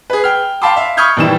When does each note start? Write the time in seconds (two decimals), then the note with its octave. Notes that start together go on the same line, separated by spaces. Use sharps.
0.10 G#4 B4
0.24 G5 F6
0.62 F5 G5 A5 B5 C6 D6
0.76 E5 F5
0.97 B5 C#6 D#6 F6 G6 G#6
1.17 A#1 D#3 E3 G3 E7